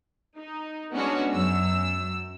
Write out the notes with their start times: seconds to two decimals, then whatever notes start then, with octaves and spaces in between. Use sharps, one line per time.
0.37 D#4
0.94 G#3 B3 C#4 D4 F#4 C#5
1.32 F#2 E6